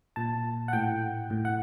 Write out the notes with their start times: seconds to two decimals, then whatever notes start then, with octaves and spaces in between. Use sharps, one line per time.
0.16 A#2 A5
0.68 F#5
0.73 A2 G5
1.30 A2
1.45 F#5